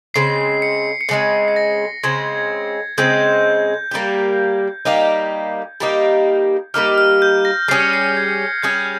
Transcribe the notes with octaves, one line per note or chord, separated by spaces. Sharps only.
C#3 G#3 C4 C7
C#7
C#7
C#3 G#3 C4 C7
C7
A#6
C#3 G#3 C4 G#6
C#3 G#3 C4 G6
G3 A#3 D#4 G4
G3 A#3 D#4 G4
G3 A#3 D#4 G4
G3 A#3 D#4 G4 F6
F6
G6
A#6
G3 C#4 G#4 C7
C#7
C7
G#6
G3 C#4 G#4 G6